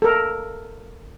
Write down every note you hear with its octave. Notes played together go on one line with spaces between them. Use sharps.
A4 A#4